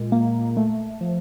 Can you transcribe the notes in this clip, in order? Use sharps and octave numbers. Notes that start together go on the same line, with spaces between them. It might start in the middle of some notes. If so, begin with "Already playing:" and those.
Already playing: A#2 G#3
A#3
A3
F3